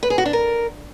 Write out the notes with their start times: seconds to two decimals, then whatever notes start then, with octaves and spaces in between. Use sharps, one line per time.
0.03 B4
0.10 G#4
0.18 F#4
0.26 D4
0.33 A#4